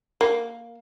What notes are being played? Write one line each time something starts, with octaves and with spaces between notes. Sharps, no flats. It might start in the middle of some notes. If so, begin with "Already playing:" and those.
A#3